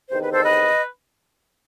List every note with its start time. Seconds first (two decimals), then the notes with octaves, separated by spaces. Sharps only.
0.09 E2 C3 D#3 C5
0.22 B4
0.33 A4 C5
0.45 B4 D#5